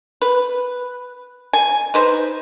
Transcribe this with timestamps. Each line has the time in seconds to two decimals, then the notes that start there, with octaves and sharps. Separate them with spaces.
0.22 B4
1.53 G#5
1.94 D#4 B4 C5